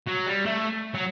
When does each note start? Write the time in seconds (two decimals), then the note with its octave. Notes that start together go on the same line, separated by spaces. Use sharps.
0.07 F#3
0.26 G3
0.46 A3
0.95 F#3